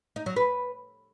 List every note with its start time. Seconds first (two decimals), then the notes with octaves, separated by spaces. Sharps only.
0.16 D#4
0.26 F#3
0.36 B4